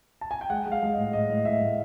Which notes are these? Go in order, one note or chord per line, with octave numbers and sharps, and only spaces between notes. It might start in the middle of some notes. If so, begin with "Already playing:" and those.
A5
G#5
G5
G#3 F#5
G#3
F5
G#3
D#5
A2
A2 D#5
A2
A2 E5
A2